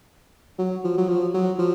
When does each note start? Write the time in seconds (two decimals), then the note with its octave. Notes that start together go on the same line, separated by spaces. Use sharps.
0.58 F#3
0.84 F3
0.98 F#3
1.09 F3
1.34 F#3
1.58 F3